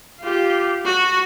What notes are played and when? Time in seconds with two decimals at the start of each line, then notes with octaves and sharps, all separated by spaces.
0.21 F4 G4
0.85 F#4